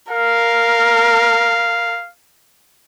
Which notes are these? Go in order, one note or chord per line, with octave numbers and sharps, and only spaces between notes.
A#4 F5